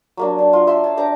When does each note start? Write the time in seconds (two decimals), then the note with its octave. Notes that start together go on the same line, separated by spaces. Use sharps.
0.17 F#3 A#3 D4
0.39 D4
0.53 F4
0.67 E5 C6
0.84 C#5 A5
0.97 D4 G5 A#5 D6